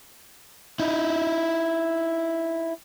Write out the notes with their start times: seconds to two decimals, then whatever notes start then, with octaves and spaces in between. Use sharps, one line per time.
0.80 D#4 E4